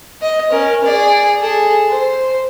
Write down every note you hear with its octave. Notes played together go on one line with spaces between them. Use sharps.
D#5
C#4 A#4
G#4 D5
G#4 A4
C5